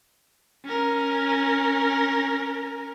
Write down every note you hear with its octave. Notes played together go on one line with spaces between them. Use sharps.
C#4 A#4